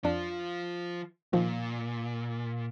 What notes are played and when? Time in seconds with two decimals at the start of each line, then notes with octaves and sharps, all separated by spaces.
0.04 F2 F3 D4 F4
1.33 A#2 D#3 F3 F4